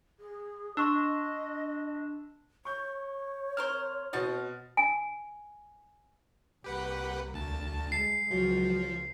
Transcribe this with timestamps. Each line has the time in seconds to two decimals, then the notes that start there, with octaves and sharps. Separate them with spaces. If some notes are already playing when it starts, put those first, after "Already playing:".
0.20 G#4
0.77 D4 D#5 C6 C#6 E6
2.65 C#5 C#6 G6
3.57 C4 A#4 C5 F6
4.13 B2 C4 F#4 D#5 A6
4.77 G#5
6.64 C2 A#3 G4 B4 F#5
7.34 D2 A5
7.92 G#3 C7
8.31 C#2 F3 F#3